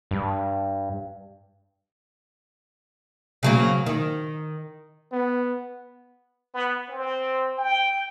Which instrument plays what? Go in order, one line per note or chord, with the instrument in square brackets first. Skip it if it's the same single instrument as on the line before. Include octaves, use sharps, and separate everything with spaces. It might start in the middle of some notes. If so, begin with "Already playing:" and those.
[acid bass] G2
[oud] C#3 F#3 A#3
D#3
[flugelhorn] B3
[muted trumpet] B3
C4
G5